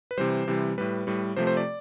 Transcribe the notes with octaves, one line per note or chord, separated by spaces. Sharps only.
B4
C3 E3 G3 C5
C3 E3 G3
A2 G3 B4
A2 G3
C3 F3 A3 C5
C5
D5